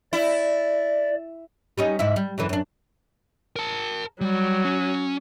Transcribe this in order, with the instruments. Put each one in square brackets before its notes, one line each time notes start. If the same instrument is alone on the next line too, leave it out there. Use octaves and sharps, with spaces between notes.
[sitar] E4 [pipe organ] D5
[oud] G3 C#4 D#4
G#2 E4 E5
G3
F#2 D3 E3
F#2 D4
[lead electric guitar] A#4 A5
[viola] F#3 [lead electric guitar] G3
[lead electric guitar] C#4